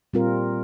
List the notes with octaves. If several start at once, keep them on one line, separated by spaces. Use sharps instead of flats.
A#2 G3 C4 F4 A#4